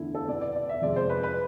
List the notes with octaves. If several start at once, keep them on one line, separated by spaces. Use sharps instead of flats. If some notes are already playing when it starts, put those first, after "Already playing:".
Already playing: E2 D3 A3 E4
A4
B2 B3 D5
D5
D5
E5
F2 C3 G#3 D5
C5
B4
B4